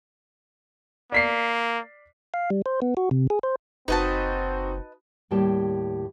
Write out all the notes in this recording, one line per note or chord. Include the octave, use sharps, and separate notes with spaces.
A#3 D5 B6 C7
F5
G3
C5
B3
F#4
C3
G#4
C5
F#1 C4 D#4 F#4 B4 D#5 A5
D#2 A2 G3 G4 C#5 A5